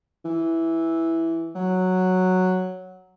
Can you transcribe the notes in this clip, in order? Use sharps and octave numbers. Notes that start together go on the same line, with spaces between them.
E3
F#3